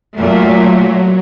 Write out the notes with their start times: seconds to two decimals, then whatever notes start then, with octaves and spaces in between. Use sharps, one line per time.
0.15 A#2 F#3 A3